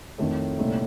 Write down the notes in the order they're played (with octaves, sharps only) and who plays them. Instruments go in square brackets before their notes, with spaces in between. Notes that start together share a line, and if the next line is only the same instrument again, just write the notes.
[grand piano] F2 D#3 A3 [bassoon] A2
[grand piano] C2 A#2 A3 D#4